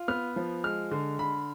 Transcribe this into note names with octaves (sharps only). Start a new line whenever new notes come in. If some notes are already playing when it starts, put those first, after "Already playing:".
Already playing: F4
B3 F6
F3
G#3 F6
D3
D3 B5